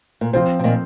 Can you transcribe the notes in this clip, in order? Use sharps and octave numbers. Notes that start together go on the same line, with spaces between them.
A#2
C3 F3 C4 F4 C5
C3
A#2 D#3